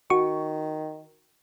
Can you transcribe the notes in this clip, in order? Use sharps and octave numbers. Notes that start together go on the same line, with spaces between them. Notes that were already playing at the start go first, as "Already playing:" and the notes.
D#3 F#4 C#6